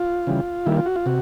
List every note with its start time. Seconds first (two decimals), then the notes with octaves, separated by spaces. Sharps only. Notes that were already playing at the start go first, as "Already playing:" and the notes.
Already playing: F4
0.27 C#3 E3 G3
0.66 D#3 G3 A#3 E4
0.77 F4
0.86 F#4
0.96 F4
1.06 C3 F#4